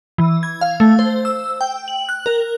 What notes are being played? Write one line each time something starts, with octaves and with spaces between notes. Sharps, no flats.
E3
G#6
F5
A3
C5
E6
G5
F#7
F#6
A#4